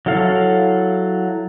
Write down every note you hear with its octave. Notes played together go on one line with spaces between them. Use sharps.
F#3 E4 A4 F5